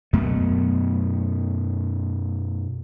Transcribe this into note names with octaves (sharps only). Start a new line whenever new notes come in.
F#2 B2 A3